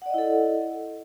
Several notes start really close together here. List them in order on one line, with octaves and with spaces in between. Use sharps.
F#5 D5 D#5 E4 A4